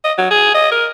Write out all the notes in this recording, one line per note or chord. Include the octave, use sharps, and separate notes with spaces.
D#5
F#3
G#4
D#5
A#4